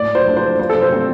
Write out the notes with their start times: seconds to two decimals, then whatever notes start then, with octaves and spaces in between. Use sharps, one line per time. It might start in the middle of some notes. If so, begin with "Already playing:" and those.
Already playing: A2 D5
0.15 C5
0.26 F3 A3 D4
0.37 C5
0.59 F3 C5
0.69 A4
0.82 C5
0.92 A3 C4